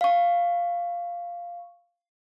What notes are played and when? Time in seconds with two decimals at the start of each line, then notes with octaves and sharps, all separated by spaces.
0.01 F5 C#6